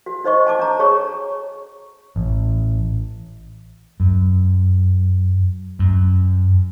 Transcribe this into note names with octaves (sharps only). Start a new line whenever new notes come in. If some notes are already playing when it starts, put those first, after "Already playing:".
F#4
D#4 C5 D#5 C#6
G#5 A5 D6
D4 A#5
G#4 C#5 C#6
A1
F#2
F#2